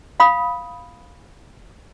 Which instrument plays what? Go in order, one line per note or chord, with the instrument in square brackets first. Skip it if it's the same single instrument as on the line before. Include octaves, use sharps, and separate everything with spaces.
[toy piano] F5 B5 D#6